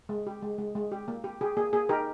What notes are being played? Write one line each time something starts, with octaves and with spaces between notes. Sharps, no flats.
G#3
G4
G#3
G#3
G#3
G4
A#3
G4
G4 G#4
A#3 G#4
A#3 G#4
D#4 G4 A#4